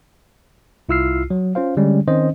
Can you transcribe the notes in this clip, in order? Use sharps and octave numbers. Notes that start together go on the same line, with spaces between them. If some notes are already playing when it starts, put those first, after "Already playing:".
C2 E4 F4 E6 F6 C7
F#3
C#4 F4 C5 F5
D3 G3 G#3 C#4
D#3 C4 C#4 C5 D#5